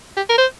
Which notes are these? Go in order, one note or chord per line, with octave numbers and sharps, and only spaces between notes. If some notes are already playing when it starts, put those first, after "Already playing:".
G4
A#4
C5